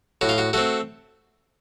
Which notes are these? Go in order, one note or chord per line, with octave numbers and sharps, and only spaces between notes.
A2 F#4
F4
F#4
A3 C4 F#4